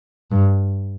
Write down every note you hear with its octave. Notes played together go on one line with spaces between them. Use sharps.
G2